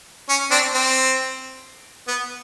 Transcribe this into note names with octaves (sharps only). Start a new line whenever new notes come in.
C#4
C4 D4
C4
B3